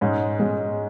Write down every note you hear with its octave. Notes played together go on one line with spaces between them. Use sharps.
G#2 G#3 C#4
G#2 G#3 C#4